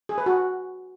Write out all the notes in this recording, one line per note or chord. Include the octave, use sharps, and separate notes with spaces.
G#4
B4
F#4